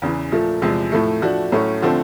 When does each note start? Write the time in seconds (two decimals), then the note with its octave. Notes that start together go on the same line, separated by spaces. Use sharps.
0.02 E2 C#3 E3
0.32 A#2 F3 A3
0.62 E2 C3 F3 G#3
0.92 A2 F3 A3
1.22 F3 A3 D4 F#4
1.52 A2 F#3 A3 C#4
1.82 D3 F3 A3 C4